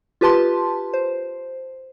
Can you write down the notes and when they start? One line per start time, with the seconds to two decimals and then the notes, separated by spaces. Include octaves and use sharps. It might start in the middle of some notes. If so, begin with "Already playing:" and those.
0.21 F4 G4 B4 A5 C6
0.94 C5